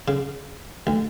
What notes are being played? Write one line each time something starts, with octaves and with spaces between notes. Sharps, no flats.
C#3
D2